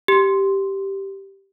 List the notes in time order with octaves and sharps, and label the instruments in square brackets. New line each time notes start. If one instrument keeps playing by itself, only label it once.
[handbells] G4